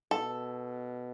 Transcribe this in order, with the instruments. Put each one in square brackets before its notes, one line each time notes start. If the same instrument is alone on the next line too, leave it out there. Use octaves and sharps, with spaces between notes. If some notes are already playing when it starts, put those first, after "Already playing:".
[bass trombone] B2 [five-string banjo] A4